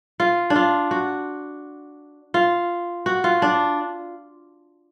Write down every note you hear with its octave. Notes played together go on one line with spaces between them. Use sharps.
F4
D4
F4
F#4
F4
F#4
F4
D4